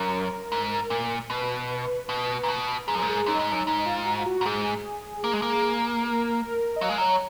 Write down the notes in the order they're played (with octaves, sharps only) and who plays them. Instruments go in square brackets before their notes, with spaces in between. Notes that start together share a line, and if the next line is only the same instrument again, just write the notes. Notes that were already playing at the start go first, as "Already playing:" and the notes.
Already playing: [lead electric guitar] F#2 [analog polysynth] A#4
[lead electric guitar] G#2
A#2
[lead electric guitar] B2 [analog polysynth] B4
[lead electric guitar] B2
A#2
B2
[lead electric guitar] G#2 [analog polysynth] G#4
[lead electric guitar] F#2
[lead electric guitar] G#2 [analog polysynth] A#4
[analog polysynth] G#4
[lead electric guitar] F#2 [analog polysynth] D#4
[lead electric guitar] G#2
F#2
[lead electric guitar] G#2 [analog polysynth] D#4
[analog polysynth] F4
F#4
F4
F#4
[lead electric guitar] A#2
[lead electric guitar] G#2 [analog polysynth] G#4
[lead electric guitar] A#3
G#3
A#3
[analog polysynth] A#4
A#4
D#5
[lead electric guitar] F#3 [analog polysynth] F5
[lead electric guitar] G#3
[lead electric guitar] F#3 [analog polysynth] C#5